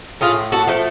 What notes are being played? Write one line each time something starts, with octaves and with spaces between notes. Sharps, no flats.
A2 F4 G#4
F#4 A4
F3 A3